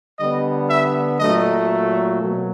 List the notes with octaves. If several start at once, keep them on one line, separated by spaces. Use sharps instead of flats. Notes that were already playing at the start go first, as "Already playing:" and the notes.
D3 G3 B3 D#5
E5
A#2 F#3 A3 D#5
B2 F#3 A#3